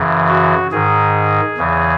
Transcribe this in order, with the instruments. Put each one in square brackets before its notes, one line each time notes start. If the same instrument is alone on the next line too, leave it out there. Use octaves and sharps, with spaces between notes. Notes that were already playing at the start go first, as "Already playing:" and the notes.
Already playing: [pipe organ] F#2 C#3 E3
F#4
G#2 D#3 G#4
E2 C#3 E3